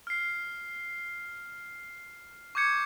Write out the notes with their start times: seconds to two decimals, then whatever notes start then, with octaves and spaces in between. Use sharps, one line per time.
0.07 F6 C7
2.55 C#6 D6 G6 G#6 C#7